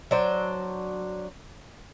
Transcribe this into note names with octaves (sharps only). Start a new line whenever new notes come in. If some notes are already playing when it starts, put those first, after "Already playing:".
F#3 D4 C5